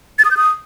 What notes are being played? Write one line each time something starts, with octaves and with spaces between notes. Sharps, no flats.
A6
D#6
G6
D#6